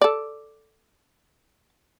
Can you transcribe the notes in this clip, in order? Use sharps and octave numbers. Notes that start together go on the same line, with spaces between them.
A4 D5